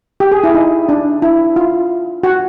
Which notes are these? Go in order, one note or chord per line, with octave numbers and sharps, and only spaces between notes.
G4
G#4
E4
D#4
D4
E4
F4
F#4